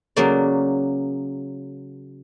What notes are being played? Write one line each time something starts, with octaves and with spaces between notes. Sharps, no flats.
C#3 F#3 A#3 D5